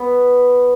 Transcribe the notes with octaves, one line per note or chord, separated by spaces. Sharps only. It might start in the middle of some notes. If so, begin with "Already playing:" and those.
Already playing: B3